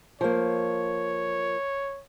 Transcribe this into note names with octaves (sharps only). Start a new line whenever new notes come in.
F3 A#3 C#5